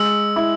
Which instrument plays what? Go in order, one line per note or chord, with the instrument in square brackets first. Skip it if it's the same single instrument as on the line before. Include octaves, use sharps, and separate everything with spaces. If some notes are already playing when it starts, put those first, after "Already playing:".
Already playing: [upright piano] G#3 [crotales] E6
[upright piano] E4